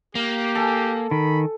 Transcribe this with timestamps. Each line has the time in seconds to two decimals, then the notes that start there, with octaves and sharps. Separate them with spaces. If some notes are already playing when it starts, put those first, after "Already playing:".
0.15 A#3 G4
0.55 A4 G#5
1.11 D#3 B5